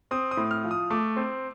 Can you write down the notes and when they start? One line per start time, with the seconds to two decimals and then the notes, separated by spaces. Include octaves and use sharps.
0.11 C4 D#6
0.31 D#6
0.37 A2
0.51 F6
0.64 F3
0.71 D#6
0.90 A3 D6
1.16 C4